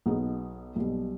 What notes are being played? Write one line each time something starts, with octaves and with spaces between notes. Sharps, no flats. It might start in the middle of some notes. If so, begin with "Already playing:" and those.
B1 B2 B3 D#4 G#4
B1 B2 G3